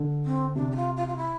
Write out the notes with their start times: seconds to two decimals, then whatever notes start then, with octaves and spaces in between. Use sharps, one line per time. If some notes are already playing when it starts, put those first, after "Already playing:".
Already playing: D3
0.25 C4
0.56 C3 D4
0.72 G4
0.76 F4
0.97 F4
1.08 F4
1.17 E4